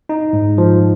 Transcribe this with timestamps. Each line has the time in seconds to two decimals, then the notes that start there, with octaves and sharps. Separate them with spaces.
0.09 D#4
0.33 G#2
0.58 F3